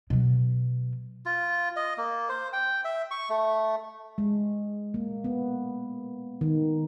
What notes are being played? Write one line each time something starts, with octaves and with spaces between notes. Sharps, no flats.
B2 F#3
F4
D#5
A#3
C5
G5
E5
C#6
A3
G#3
A#3
B3
D#3